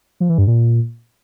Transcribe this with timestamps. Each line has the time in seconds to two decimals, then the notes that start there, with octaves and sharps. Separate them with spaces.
0.20 F3
0.29 E3
0.38 G2
0.47 A#2